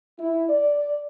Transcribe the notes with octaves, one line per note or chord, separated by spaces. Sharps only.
E4
D5